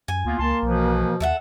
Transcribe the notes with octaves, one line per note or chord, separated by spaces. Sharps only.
F#2 G#5
D2 A#3 B3 F4
C#2 A#3 A5 C6
B1 B2 E3 F3
D#2 A4 E5 F#5